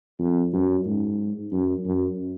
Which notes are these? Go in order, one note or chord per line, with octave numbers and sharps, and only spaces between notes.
F2
F#2
G#2
F#2
F#2